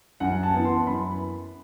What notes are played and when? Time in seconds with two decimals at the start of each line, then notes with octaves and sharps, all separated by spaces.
0.20 F#2 F#5
0.43 A5
0.54 E3 B3
0.65 C6
0.86 F#2 B5